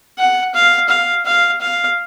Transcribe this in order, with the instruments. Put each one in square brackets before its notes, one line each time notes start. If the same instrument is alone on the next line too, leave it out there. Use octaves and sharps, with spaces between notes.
[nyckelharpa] F#5
F5
F5
F5
F5